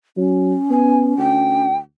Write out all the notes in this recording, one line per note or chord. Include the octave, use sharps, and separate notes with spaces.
F#3 C#4
B3 G#5
D2 G5